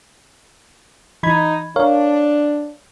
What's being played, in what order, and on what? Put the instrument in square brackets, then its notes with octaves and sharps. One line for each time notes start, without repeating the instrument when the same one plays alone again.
[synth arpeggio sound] E3 B5 G#6 [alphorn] D#4
[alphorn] D4 [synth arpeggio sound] A#4 C#5 F5